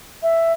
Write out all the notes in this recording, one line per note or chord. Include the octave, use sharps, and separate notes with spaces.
E5